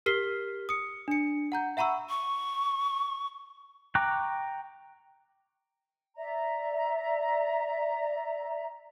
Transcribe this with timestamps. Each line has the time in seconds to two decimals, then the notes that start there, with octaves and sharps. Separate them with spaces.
0.06 G4 A#4 F6 B6 C7 G7
0.69 D#6 C#7
1.08 D4 C#7
1.52 F#5 A#5 G6
1.77 E5 F#5 A#5 B5 C#6 E6
2.09 C#6
3.95 G5 A#5 C#6 D6 F#6
6.17 D5 E5 A#5